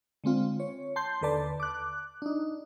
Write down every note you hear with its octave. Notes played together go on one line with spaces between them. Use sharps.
D3 G#3 C4 F4
C#5
A5 C6 G6
D#2 D3 A4 B4 D5 A5
D6 F#6
D4 D#4